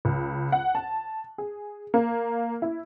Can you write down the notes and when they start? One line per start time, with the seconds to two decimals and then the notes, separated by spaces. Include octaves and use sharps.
0.05 C#2
0.52 F#5
0.75 A5
1.38 G#4
1.94 A#3
2.62 E4